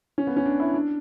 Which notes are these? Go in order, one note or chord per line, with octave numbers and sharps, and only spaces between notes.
C#4
B3
C#4
D4
E4
D4